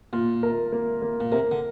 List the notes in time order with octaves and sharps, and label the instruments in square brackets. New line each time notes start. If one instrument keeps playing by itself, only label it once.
[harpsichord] A#2 [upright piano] F4
[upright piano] A#4
A#3
A#3
[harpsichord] A#2
[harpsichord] C3 [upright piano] A#4
[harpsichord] D3